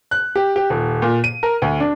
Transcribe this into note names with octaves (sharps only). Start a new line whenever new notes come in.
F#6
G4
G4
D#1
A#2
D#7
A#4
D2
D4